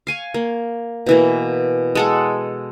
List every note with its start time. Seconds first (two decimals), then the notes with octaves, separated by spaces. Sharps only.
0.07 F5 G#5 C#6
0.34 A#3
1.06 B2 E3 A#3
1.95 G#3 A4 F#5